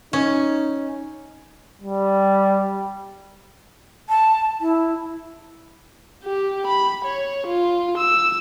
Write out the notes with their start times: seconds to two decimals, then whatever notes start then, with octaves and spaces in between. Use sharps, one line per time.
0.13 C#4 D#4
1.82 G3
4.09 A5
4.61 E4
6.24 G4
6.67 B5
7.05 C#5
7.47 F4
7.98 E6